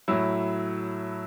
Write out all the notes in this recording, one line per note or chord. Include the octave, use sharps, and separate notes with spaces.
A2 F#3 E4